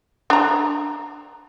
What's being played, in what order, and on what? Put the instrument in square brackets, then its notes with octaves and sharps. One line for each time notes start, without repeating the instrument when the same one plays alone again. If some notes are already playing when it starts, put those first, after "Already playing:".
[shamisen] D4 A#5